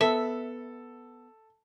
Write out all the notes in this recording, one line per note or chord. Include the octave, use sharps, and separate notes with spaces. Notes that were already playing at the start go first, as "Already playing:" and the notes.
B3 A4 E5